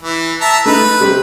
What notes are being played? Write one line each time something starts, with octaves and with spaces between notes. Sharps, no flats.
E3
E5 A5 A#5
A3 D#4 B4
C3 G3 C4